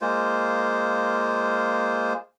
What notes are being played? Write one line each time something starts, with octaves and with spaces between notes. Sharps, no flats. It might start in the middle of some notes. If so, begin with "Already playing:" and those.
G#3 A#3 F4 C5